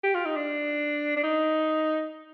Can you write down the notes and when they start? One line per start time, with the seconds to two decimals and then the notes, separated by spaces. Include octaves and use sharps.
0.03 G4
0.14 F4
0.25 D#4
0.36 D4
1.16 D4
1.24 D#4